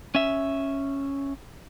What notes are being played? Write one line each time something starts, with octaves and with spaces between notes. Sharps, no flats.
C#4 E5